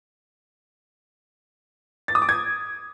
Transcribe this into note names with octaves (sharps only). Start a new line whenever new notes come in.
A6
D#6
D6
G#6